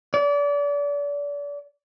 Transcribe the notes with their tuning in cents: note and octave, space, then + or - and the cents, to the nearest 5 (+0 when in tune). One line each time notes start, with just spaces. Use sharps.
D5 -35